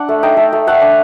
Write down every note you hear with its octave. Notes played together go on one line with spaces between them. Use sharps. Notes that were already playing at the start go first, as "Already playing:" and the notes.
Already playing: D4 D5 F#5
A3
D#4 G5
A3
A3
A3 F#5
D4